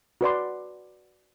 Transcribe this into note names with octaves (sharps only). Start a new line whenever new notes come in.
F#4 B4 D5 C6